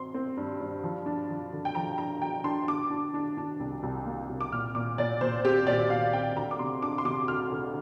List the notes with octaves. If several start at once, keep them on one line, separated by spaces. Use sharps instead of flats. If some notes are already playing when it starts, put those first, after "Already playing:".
Already playing: G2 C4 C6
C4
G2
G2
F3
D4
F3
D3
G5
F3 A#5
D4 A#5
F3 G5
D4 C6
D4 D6
D4
D4
D4
C2
C2
A#3
C2
D6
A#2 F6
A#2 D6
A#2 D5
A#2 C5
C4 G4
A#2 D5
A#2 F5
C4 G5
D2 A#5
D6
C3 C6
D4 D6
C6
C3 D6
D2 F6
D2